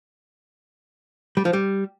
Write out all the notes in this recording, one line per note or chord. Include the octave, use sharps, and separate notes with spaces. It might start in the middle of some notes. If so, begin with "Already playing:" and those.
G3
F3
G3